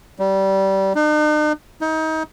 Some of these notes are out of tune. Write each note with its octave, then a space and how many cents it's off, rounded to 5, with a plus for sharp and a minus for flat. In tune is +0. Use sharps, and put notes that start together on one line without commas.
G3 -20
D#4 -45
D#4 +30